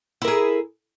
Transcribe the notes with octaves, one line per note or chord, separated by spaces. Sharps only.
E4 G#4 A#4